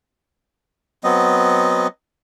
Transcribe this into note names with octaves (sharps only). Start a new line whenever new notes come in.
F#3 B3 C4 D#5